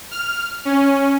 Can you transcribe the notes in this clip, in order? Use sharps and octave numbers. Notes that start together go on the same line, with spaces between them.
F6
C#4